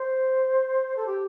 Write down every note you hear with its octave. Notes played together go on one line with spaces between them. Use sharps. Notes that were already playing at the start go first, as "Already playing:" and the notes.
Already playing: C5
A4
G4